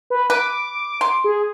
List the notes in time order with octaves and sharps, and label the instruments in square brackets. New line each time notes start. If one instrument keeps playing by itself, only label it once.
[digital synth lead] B4
[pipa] B4 [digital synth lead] D6
[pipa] C6
[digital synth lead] G#4